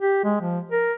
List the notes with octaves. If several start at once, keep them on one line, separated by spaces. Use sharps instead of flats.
G4
G#3
F3
A#4